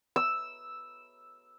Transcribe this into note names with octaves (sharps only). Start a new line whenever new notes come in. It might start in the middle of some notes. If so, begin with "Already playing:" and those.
E6